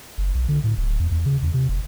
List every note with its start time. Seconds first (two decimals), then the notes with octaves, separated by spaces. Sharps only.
0.18 F#1
0.35 B1
0.48 D3
0.64 A2
0.77 D1
0.99 E2
1.11 E2
1.26 C#3
1.42 E2
1.54 C3
1.69 F1